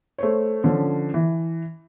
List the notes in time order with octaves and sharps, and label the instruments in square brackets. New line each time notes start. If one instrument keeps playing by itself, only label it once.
[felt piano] A3 C5 C#5
D3 F3 C#4
E3